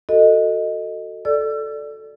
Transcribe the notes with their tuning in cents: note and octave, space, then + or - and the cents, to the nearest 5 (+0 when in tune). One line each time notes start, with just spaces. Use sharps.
F#4 +0 A4 +25 D#5 +0
A4 +0 D5 +0 E6 +35